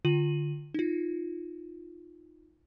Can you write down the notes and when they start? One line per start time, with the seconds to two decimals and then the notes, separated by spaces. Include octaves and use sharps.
0.05 D3 F4 D#7 F#7
0.74 D#4 F4